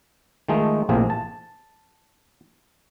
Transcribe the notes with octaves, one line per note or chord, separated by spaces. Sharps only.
D#3 F3 G#3 A3 D#4
A#1 A2 C3 A#3 G#4 C5
A5